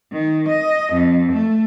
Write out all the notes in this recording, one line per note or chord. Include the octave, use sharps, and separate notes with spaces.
D#3
D#5
F2
A3